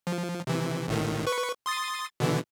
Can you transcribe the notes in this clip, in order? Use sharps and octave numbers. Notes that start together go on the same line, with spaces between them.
F3
C3 E3
A1 A2 D#3
B4 C#6
C6 D#6 A6
B2 D3 E3